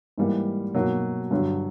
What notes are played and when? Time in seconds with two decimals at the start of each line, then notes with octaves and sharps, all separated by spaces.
0.18 G#2 E3 G3 A#3
0.74 B2 F#3 A#3 D#4 F#4
1.31 G2 D3 F#3